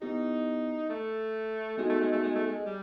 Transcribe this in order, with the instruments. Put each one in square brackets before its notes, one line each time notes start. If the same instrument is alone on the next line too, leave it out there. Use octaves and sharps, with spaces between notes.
[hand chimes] B3 E4 G4 [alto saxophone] D#4
[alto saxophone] A3
[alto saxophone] G#3 [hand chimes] B3 D#4 F#4 A4
[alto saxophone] A3
G#3
A3
G#3
A3
G#3
G3